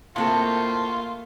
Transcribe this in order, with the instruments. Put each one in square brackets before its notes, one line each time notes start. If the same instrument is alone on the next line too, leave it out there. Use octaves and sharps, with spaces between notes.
[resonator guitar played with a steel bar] A2 C4 A4 [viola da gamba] A3 A#3 [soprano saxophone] F4